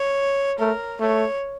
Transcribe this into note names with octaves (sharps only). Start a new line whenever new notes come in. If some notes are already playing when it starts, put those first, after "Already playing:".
Already playing: C#5
A3 A#4
A3 C#5